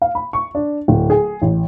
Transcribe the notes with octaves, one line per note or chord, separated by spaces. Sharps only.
F5
B5
C#6
D4
D1
G#4
A1